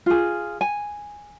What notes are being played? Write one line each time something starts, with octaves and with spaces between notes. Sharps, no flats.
F4 G#4
G#5